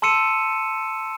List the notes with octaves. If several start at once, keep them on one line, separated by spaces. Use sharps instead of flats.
A5 C6 E6 C#7 D#7 E7